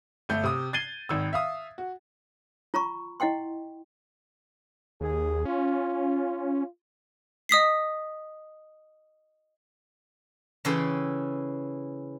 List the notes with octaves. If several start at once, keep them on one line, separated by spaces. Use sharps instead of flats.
G1 A3 G6
C3 D#6
G#6 A6 C7 D#7 G7
G#1 D#3 E6
E5 F5 D#6
F#4
F4 A#5 B5 C#6
E4 D#5 F#5 G5 C6
D#2 G#4
C#4 F4
D#5 D#6 B6 C7
C#3 E3 E4 A4 G5 C6